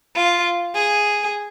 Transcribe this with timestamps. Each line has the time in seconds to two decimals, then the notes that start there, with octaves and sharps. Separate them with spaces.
0.15 F4
0.74 G#4